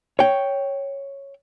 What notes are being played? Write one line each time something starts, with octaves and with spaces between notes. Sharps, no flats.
C#5 G5